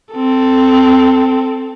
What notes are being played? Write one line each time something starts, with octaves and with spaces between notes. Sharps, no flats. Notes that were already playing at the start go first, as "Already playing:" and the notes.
C4 A4